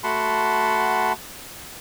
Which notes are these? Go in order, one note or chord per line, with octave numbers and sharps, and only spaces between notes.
A3 F#4 F#5 A5 B5 C6